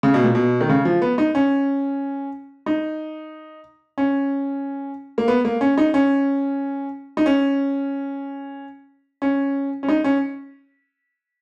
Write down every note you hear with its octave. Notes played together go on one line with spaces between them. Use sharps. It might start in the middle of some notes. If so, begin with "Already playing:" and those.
C#3
B2
A#2
B2
D#3
C#3
F3
B3
D#4
C#4
D#4
C#4
A#3
B3
A#3
C#4
D#4
C#4
D#4
C#4
C#4
C#4
D#4
C#4